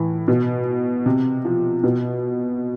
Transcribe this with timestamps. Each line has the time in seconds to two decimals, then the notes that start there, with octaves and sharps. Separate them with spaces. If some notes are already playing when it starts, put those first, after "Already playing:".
Already playing: A2 E3
0.28 B2
1.06 C3
1.45 F3
1.84 B2